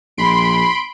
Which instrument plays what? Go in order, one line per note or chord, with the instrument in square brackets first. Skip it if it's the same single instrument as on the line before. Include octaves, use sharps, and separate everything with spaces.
[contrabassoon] A#1 [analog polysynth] B5 C6 D7